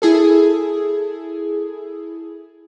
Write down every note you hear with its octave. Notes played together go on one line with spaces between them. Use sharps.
E4 G#4 A4